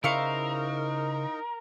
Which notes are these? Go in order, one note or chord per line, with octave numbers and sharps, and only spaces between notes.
C#3 D#4 E4 A#4 C5 F5 C#6